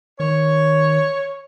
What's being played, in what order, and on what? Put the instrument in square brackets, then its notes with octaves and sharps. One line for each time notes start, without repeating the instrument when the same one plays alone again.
[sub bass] D#3 [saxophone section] C#5